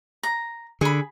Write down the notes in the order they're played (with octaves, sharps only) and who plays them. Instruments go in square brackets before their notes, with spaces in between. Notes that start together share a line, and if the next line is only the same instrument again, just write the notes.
[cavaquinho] A#5
[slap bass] D3 [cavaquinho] G#4 B5